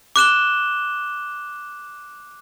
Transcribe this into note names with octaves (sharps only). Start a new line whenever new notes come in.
D6 F#6 E7 G7